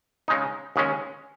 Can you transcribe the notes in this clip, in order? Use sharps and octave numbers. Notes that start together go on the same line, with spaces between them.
C#3 G#3 D#4
D#2 C#3 G#3 C#4